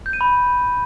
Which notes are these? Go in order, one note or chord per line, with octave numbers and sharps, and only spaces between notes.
G6
D#7
B5